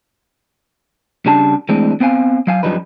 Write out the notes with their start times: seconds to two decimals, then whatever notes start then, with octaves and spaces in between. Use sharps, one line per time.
1.26 C#3 G3 D4 A5
1.69 E3 G#3 A3 C4 D4
2.00 B3 C4 C5 F5 G#5
2.47 F#3 F5 G#5
2.63 F#2 A#2 F3 G3 D#4 B4